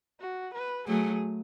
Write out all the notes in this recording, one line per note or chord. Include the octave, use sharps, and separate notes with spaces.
F#4
B4
F#3 A3 G#4